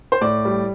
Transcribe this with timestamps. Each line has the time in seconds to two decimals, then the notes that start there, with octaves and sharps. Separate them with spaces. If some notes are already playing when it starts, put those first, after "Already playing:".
0.12 C5
0.21 A2 D5
0.45 G3